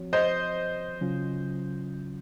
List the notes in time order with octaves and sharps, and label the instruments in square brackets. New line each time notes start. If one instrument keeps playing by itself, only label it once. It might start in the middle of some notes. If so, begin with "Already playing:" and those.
Already playing: [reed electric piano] F3 C4 F#4 C#5
[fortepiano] C5 D#5
[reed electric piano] C#3 F#3 C#4 F4